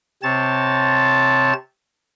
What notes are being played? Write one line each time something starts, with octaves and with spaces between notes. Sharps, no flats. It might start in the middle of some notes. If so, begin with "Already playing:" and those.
C3 C4 C#5 A5 A6